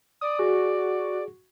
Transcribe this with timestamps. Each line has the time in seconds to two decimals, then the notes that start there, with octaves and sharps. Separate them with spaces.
0.21 D5 D#6
0.39 F#4 G#4